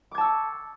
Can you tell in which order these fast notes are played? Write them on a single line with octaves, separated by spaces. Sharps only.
D6 G#6 A5 E6 C#6